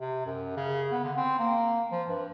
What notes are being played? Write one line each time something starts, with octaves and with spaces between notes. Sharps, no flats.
C3
F#2
C#3
B3
D3
C4
A#3
F3
G2